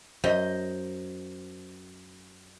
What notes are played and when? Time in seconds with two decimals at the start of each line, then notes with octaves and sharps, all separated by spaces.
0.24 F#2 C5 D#5